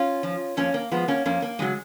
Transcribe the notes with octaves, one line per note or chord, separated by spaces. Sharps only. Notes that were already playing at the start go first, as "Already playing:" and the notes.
Already playing: C#4 F4
F3
F2 A#3 C#4
A#3
F3 G#3 B3
A#3 C#4
F2 A#3 C#4
A#3
C#3 F#3 G#3